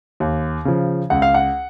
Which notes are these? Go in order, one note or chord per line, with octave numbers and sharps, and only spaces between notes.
D#2
C#3 F3
C#2 F#5
F5
F#5